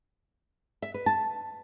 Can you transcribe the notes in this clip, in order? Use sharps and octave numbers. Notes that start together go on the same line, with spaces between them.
E5
B4
A5